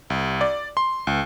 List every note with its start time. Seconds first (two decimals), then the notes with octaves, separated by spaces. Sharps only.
0.10 C2
0.41 D5
0.77 C6
1.07 C#2